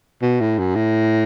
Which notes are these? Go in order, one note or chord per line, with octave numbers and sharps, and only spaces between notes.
B2
A2
F#2
A2